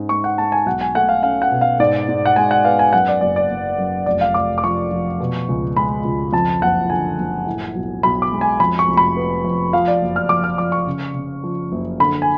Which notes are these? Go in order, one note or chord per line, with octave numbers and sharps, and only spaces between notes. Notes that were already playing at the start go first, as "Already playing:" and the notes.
Already playing: G#2 C#4
G#3 C#6
F#5
G#3 A5
G#5
B1 F#5
G#5
A3 F#5
F5
C#4 F5
F#5
B2
F5
G#2 D5
G#2
F#5
G#3 G#5
F#5
B3 F5
G#5
F#2 F#5
D5
F#1 D5
D5
F#1
F#2
F1 D5
F5
F1 D6
D6
F3 C#6
F3
B2
C#2
G#3 B5
C#2
F2 A5
F#1 F#5
D3 G#5
F#1
A2
B1
B1 B5
D6
G#3
G#5
F2 B5
C#6
F1
B5
B3
F2
F3 F5
D5
F#1
F6
F2 D6
F6
F3 D6
C#6
C#3
C#3
F3
F#1
D3 B5
G#5